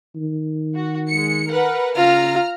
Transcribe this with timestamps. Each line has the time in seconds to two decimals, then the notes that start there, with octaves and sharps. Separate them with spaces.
0.16 D#3
0.76 F#4
1.10 G#3 C#7
1.50 A#4 B4 F#5
1.96 C#3 F4 A#5 F6